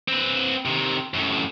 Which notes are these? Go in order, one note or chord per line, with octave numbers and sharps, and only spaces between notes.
C4 B4
C3 D#3
F#2 A2